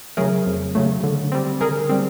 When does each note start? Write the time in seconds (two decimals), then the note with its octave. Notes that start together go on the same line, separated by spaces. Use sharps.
0.17 C#3 F#3 A3 G#4 A#4
0.46 F2
0.75 C#3 F#3 A3
1.03 D3
1.32 G3 C4
1.61 D3 G#4 A#4
1.89 G3 C4